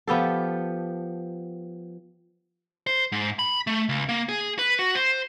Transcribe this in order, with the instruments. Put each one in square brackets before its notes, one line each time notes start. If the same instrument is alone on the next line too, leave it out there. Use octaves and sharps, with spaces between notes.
[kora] F3 B3 G4 A4
[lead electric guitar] C5
G#2
B5
A3
C#2
A#3
G#4
B4
F#4
C5